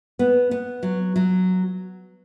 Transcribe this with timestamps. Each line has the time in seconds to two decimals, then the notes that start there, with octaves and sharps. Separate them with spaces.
0.19 B3
0.51 B3
0.83 F#3
1.16 F#3